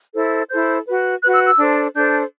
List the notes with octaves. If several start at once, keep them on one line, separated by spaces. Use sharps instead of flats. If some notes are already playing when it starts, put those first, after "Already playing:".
E4 A4 C5
E4 A4 C5 G6
F#4 B4
F#4 B4 F#6
E6
E6
D4 A4 C5
D4 A4 C5 G6